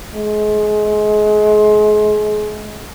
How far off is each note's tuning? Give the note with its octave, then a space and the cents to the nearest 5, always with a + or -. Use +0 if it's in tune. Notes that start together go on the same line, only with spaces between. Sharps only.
G#3 +30